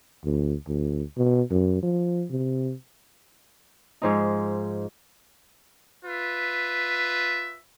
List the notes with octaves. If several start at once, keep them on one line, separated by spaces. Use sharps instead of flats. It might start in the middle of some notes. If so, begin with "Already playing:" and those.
D2
D2
B2
F#2
F3
C3
G#2 F3 D#4
F4 B4 E5